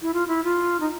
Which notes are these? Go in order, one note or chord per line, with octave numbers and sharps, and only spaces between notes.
E4
F4
E4
F4
D#4